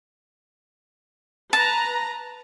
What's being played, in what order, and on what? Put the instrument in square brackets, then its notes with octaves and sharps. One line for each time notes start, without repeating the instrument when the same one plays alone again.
[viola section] B4 A#5 [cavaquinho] A5